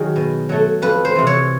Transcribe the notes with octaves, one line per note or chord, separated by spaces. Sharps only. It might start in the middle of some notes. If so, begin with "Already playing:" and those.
Already playing: D#3 F#3 F#4 G#4
B2
F#3 A3
F2 B4
C5
C3 E3
C#5